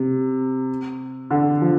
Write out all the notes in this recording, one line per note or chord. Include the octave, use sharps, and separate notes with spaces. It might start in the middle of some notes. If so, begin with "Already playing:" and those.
Already playing: C3
D3
F3